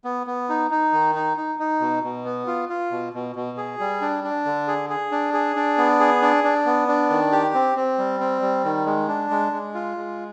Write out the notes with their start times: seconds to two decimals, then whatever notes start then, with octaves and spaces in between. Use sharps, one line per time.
0.04 B3
0.27 B3
0.49 D#4
0.71 D#4
0.93 D#3
1.15 D#4
1.37 D#4
1.59 D#4
1.80 B2
2.04 B2
2.25 B3
2.47 F4
2.69 F4
2.91 B2
3.13 B2
3.36 B2
3.57 G#4
3.80 G3
4.01 D4
4.24 D4
4.45 D3
4.67 G#4
4.90 G#4
5.12 D4
5.34 G#4
5.56 D4
5.78 B3
6.00 G#4
6.22 D4
6.44 D4
6.66 B3
6.88 D4
7.10 D#3
7.32 G4
7.54 C4
7.76 C4
7.98 G3
8.20 C4
8.42 G3
8.64 D#3
8.86 G#3
9.08 D4
9.30 G#3
9.52 G#3
9.74 F4
9.97 G#3